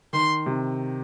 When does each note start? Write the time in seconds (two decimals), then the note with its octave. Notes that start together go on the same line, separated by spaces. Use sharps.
0.13 D#3 C6
0.46 C3